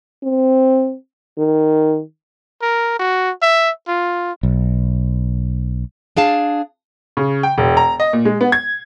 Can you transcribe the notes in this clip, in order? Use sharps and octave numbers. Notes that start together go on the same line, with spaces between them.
C4
D#3
A#4
F#4
E5
F4
B1
D4 G#4 F5 A5
C#3
G5
E1
A#5
D#5
A#2
G#3
B3
G#6